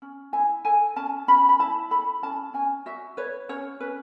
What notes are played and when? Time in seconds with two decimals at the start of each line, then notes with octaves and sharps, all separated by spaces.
0.02 C#4
0.33 E4 G#5
0.65 A4 G#5
0.96 C#4 A5
1.28 C#4 B5
1.49 B5
1.59 E4 A5
1.91 A4 B5
2.22 C#4 A5
2.54 C#4 G#5
2.86 F#4 E5
3.17 B4 C#5
3.49 C#4 C#5
3.80 C#4 B4